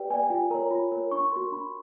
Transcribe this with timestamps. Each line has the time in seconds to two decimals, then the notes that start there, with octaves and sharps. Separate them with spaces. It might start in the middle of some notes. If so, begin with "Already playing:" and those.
Already playing: G4 B4 D5 G5
0.10 B4 D5 G#5
0.22 G5
0.30 F4 G#5
0.50 A#4 C#5 A#5
0.71 F4 B5
0.91 A#4 C#5
1.11 D4 C#6
1.32 F#4 A#4 C6
1.52 D4 B5